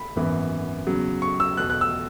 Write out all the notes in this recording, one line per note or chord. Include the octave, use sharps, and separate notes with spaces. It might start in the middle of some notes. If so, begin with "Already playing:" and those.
Already playing: B5
G#1 F#2 E3 B3
E2 C#3 F#3
C#6
E6
E2 B2 B3 F#6
F#6
E6